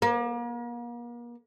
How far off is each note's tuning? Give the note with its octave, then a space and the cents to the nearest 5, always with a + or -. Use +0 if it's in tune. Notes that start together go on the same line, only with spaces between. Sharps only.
A#3 +40